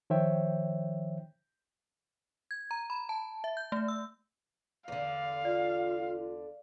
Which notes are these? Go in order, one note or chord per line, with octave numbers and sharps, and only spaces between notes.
D#3 F3 C5 C#5 E5 G5
G#6
A#5
B5
A5
E5
G6
A3
E6
E2 D3 F5
F4 D5